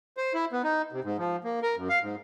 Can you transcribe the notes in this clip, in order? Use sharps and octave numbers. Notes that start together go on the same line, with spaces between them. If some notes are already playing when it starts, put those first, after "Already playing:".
C5
E4
B3
D#4
C3
G#2
F3
A#3
A#4
F#2
F5
G#2